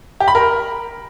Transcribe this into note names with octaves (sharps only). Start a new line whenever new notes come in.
G4
B5
A#4